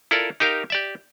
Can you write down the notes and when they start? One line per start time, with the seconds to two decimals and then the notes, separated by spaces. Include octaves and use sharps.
0.11 E4 F4 A4 A#4 D5
0.40 D#4 G4 A#4 F5
0.70 G4 D5 E5